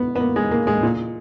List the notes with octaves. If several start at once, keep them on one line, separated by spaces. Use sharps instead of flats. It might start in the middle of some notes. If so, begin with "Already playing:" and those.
Already playing: B3
B3
A#3
G#3
A#3
G#3
A#2